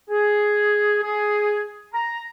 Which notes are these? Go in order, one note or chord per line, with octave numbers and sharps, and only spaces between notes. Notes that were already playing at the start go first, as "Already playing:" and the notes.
G#4
G#4
A#5